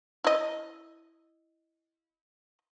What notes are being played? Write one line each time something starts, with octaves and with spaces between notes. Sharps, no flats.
E4 D#5